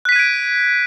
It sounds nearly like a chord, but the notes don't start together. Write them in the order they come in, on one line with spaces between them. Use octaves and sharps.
F#6 B6 D#7 G#6 D7